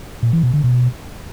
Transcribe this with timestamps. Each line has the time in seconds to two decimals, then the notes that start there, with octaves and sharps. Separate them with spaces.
0.23 A#2
0.33 E3
0.43 B2
0.54 D3
0.64 B2